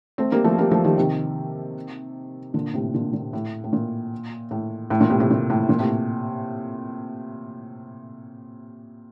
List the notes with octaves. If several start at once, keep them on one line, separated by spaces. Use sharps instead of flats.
A3 C4
G3 A#3
F3 A3
G3 A#3
F3 A3
D#3 G3
C3 D#3
A#2 D3
A2 C3
A#2 D3
A#2
A2
A2
A#2
A2
A2
A#2
A2 C3
A2 C3
A#2
A2
A#2
A2 C3